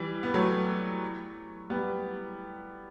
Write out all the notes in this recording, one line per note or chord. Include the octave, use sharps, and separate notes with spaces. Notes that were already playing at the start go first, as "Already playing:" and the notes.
Already playing: E3 G3
B3
F#3 A3
G3 B3